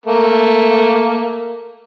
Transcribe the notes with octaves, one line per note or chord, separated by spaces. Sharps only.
A3 A#3